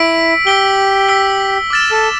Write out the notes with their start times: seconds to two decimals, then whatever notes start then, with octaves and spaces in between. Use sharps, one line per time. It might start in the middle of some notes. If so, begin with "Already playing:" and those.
Already playing: E4 E6 B6 D7
0.46 G4 E6 B6 D7 G7
1.08 E6 B6 D7 G7
1.70 D6 F6 A6 E7
1.91 A4